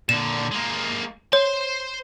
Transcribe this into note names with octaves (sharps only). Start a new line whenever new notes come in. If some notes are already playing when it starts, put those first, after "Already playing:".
A#2 D3 E7
G#3 A#3
C5 C#5 C6